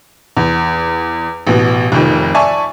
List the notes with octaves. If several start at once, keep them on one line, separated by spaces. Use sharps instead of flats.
E2
A1 B2
F1 F2 D#3
D5 E5 G#5 A5 C#6